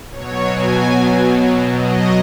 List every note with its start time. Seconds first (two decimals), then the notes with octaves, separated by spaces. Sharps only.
0.11 B2 F#3 C#5
0.52 G#5
1.76 D#5